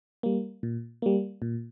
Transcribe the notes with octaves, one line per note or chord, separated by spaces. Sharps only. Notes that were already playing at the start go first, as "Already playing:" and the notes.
G3 A#3
A#2
G3 A#3
A#2